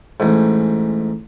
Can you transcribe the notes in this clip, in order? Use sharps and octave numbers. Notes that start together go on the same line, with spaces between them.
A1 G#2